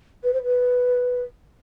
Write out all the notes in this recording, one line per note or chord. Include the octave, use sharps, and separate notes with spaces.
B4
C5
B4